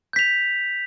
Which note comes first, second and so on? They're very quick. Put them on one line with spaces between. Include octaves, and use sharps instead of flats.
G6 B6 F7